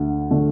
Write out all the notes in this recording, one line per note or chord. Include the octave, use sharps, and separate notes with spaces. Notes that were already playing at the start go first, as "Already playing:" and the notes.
Already playing: D2 D3
D3 A3